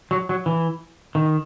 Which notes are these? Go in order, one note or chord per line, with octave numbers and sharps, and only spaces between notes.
F#3
F#3
E3
D#3